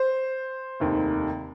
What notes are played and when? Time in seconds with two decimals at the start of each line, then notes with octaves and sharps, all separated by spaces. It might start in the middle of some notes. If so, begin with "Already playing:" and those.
Already playing: C5
0.80 F1 D#2 D#3